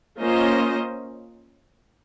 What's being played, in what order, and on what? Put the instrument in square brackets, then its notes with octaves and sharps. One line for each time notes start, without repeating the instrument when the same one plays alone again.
[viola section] A#3 C#4 F4 C5 D#5